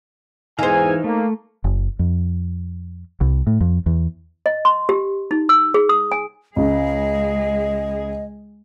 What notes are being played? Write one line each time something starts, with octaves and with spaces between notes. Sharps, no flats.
E2 G#2 E3 D#4 C5 F5 G#5
A3 A#3
F#1
F2
C2
A2
F2
E2
D#5
C6
G4
D#4
E6
G#4
D#6
G#5
C#2 C#3 G#3 G#4 D#5